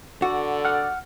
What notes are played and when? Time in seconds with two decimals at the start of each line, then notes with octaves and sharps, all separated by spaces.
0.22 D3 F#4 A4 D5
0.65 F#5 F6